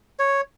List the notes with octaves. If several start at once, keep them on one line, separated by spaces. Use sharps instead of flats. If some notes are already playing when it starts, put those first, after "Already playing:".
C#5